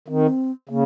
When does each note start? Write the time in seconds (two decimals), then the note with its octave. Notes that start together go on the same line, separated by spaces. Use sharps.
0.08 D#3 C4
0.69 C#3 A#3